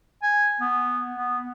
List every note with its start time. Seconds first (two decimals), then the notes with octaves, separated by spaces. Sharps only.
0.23 G#5
0.61 B3
1.16 B3